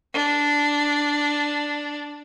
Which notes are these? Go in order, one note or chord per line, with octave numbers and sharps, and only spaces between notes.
D4